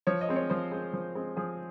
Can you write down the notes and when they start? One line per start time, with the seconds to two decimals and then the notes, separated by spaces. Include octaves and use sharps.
0.07 F3 C#5
0.21 D#5
0.29 G#3 C4
0.36 C#5
0.50 F3 C5
0.72 G#3 C4
0.94 F3
1.15 G#3 C4
1.37 F3 G#4